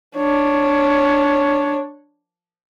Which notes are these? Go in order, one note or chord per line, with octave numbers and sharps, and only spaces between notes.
D4 C#5